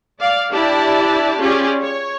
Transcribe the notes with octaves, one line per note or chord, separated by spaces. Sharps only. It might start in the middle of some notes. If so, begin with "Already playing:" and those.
D5 F5
D4 E4 G4 D5 A5
C#4 F4 G4 G#4 D5
C#5